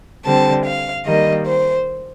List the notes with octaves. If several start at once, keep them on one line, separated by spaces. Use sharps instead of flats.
D3 G3 C4 A5
F5
D#3 G3 A#3 D#5
C5